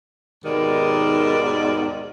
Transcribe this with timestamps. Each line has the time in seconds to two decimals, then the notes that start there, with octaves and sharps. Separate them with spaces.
0.44 D#2 G#2 B2 D#3 D5